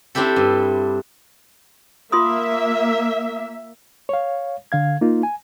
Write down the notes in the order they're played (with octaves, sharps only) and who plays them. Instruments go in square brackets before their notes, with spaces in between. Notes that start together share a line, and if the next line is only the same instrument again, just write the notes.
[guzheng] C4 D4 E4 G4 A4
G2
[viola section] A#3 E5 [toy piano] F4 C6 D#6
[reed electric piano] C#5 F5
D3 F5 G#6
A#3 D#4 F4
G#5